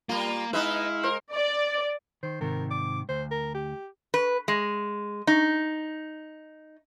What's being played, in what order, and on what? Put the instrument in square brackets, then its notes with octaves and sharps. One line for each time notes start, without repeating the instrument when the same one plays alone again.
[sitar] G3 F4 [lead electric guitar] A#3 A#4
[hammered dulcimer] G#3 [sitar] B3 D#4 B4 [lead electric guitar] E4 [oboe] F5
[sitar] A#4 [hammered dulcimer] C5
[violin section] D5
[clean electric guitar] D#3 [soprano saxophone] C5
[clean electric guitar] G#2 C3 D#3 [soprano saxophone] A#4
[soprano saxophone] D6
[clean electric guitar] D2 [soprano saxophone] C5
[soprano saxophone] A#4
G4
[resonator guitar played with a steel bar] B4
G#3
D#4